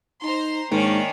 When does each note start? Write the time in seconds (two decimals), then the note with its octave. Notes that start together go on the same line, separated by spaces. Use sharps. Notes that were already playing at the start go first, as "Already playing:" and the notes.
0.23 D#4 C5 A#5 C6
0.72 G#2 D#3 A#3 C#4 D4